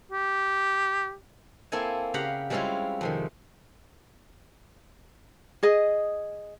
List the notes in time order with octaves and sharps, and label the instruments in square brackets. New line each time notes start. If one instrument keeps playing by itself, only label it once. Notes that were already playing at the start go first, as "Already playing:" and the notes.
[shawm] G4
[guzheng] A#3 C4 E4 A4 G#5
C#3 G4 F5 F#5 A#5 B5
G3 G#3 C4 C#4 E4 F4
F2 C3 D#3
[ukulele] G#4 D#5